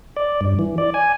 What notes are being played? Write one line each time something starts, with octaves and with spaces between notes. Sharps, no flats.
D5
G2
E3
D5
G#5